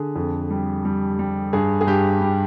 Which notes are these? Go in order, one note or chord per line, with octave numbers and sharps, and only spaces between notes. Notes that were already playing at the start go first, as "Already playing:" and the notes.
Already playing: D3 G#4
F2
G3
G3
G3
G2 G#4
G#4
G2 G4
G3 G4